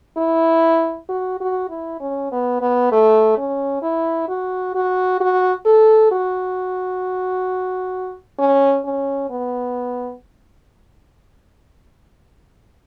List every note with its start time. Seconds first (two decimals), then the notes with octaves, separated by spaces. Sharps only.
0.18 E4
1.09 F#4
1.40 F#4
1.70 E4
2.00 C#4
2.32 B3
2.61 B3
2.92 A3
3.37 C#4
3.82 E4
4.29 F#4
4.75 F#4
5.21 F#4
5.66 A4
6.12 F#4
8.39 C#4
8.85 C#4
9.30 B3